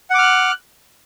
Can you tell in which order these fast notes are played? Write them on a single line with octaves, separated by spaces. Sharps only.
F#5 D6 F6 F#6